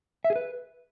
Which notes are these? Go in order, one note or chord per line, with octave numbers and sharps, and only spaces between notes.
E5
G#4
B4